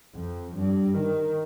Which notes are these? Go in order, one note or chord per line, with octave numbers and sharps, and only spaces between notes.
F2
G2
D#3